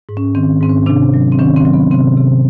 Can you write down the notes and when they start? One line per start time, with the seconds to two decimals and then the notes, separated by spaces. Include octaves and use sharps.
0.09 G#2
0.17 C#4
0.35 D#3 C4
0.61 G#2 C4
0.69 C#4
0.86 C3 D4
1.14 F#3
1.32 C4
1.39 D#3 C#4
1.56 C4
1.65 F#3
1.74 B3
1.91 C3 C4
2.17 C3